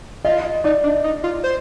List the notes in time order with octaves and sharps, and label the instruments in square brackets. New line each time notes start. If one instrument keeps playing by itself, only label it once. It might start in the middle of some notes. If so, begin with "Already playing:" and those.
[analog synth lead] F4 [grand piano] D#5
[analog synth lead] D#4 [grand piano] D5
[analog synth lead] D4
D#4
F4
C5